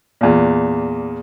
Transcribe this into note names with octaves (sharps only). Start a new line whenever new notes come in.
E2 A#2